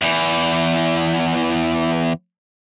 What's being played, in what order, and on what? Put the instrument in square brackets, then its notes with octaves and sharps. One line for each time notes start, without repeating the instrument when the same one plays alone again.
[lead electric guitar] E2 E3